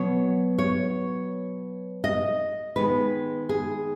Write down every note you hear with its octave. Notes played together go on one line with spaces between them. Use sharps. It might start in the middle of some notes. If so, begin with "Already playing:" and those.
Already playing: B2 F#3 B3 C#5
C#5
D#5
D#3 G#3 B3 B4
G#4